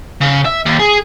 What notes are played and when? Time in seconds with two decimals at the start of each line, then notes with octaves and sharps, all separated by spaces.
0.21 C#3
0.46 E5
0.66 D#2
0.80 G#4